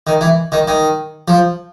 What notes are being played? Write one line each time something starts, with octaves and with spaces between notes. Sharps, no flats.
D#3
E3
D#3
D#3
F3